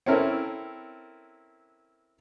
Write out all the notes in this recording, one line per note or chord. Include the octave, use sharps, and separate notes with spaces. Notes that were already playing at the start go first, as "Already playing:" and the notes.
C4 C#4 E4 A4 A#4